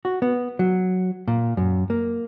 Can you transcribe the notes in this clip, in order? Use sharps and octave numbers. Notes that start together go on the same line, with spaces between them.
F#4
B3
F#3
A#2
F#2
A#3